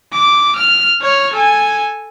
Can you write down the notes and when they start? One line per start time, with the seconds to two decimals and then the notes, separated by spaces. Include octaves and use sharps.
0.13 D6
0.56 F6
1.02 C#5 F6
1.33 A4 G#5